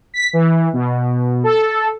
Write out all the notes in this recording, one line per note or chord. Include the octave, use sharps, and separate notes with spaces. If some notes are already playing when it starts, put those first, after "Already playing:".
B6
E3
B2
A4